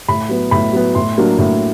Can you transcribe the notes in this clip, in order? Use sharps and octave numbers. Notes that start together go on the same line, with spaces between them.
A2 B5
F#3 B3
A2 B5
F#3 B3
A2 C6
F#3 A#3 D4
A2